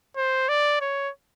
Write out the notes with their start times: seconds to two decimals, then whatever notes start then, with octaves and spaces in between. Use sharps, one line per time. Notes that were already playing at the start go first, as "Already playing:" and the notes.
0.16 C5
0.49 D5
0.81 C#5